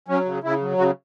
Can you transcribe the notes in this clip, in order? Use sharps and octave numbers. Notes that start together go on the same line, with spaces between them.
F#3 C#4
C#3
C#3 E4
F#3
C#3 F#4